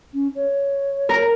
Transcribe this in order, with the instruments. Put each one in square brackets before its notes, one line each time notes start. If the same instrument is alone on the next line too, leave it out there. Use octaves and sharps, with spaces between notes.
[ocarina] C#4
C#5
[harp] A#4